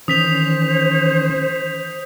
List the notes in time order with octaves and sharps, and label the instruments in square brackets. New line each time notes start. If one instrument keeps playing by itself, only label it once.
[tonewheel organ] D#3 E3 C#4 [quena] C5 [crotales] D#6 B6 F7